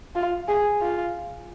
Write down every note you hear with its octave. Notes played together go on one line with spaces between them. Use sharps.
F4
G#4
F4